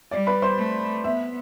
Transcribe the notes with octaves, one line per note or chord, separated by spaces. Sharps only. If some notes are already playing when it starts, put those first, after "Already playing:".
G3 D5
B4 B5
C5 C6
A3
B3 E5